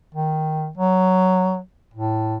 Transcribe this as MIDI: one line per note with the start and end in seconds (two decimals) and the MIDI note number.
0.15 0.70 51
0.77 1.59 54
1.94 2.37 45